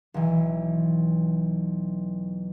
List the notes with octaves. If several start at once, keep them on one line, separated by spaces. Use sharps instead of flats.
B1 E3